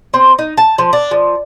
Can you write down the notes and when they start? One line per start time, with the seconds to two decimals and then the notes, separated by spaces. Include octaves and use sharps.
0.14 C4
0.39 D#4
0.57 A5
0.78 F3
0.93 D4
1.11 F3